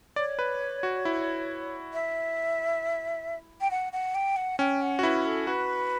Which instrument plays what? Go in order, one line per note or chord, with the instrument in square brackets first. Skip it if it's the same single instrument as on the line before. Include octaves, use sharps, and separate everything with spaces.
[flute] C#5 [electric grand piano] D5
[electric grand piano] B4
F#4
E4
[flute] E5
G5
F#5
F#5
G5
F#5
[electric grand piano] C#4 [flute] G5
[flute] F#5
[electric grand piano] F#4
[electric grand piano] E4 [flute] B4
[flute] A4
[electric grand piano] F#4 [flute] B4